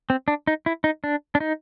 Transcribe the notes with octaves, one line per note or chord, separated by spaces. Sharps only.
C4
D4
D#4
E4
D#4
D4
D4
D#4